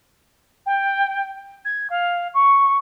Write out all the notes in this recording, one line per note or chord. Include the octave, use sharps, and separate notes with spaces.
G5
G#6
F5
C#6